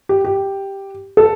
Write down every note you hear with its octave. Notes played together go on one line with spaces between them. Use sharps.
G4
G4
A4